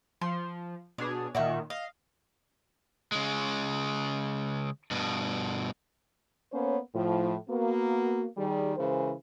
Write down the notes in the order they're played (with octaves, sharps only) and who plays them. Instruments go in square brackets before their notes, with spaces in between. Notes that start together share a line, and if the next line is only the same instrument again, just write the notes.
[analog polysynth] F3 [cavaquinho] C6
[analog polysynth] B2 D4 G#4 [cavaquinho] C#5
[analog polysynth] A#2 D#3 [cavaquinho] F#4 E5 C#6
[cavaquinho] D#5 [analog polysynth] F5
[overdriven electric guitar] C#3 G#3
G2 B2
[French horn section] A#3 B3 C#4 C5 C#5
A2 F3
A#3 B3 F#4
D#3 G3 G#4
C#3 E3 G#3 A#4 C5